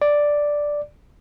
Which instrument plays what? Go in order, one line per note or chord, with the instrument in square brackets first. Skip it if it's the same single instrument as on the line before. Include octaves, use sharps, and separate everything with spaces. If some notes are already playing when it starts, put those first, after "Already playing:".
[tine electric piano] D5